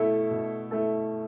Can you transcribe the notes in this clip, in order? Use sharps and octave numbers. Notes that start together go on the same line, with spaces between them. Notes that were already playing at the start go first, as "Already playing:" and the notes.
Already playing: B2 A3 E4 A4
B2
A3 E4 A4